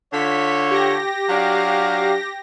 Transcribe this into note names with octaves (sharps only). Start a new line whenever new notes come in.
D3 F4 C#5 B6
G4 A#6
F#3 D4 F5